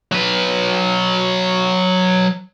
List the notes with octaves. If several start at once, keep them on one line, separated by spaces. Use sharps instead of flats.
F#3 B4